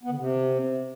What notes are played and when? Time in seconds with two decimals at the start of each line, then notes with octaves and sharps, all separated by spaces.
0.03 B3
0.11 D3
0.18 C3